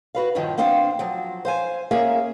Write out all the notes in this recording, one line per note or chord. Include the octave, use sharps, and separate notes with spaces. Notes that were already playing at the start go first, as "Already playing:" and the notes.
F#4 B4 F5
G2 A#2 D3 D#3 F3
B3 C4 D4 C5 F5 G5
F3 F#3
C5 F5 G#5
A#3 C#4 G#4 A#4 E5